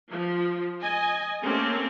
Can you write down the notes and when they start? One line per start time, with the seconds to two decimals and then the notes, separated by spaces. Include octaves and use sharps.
0.12 F3
0.82 D#5 G#5
1.43 A3 A#3 C4 C#4 G4 A4